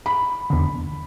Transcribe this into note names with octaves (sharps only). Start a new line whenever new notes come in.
B5
E2 D3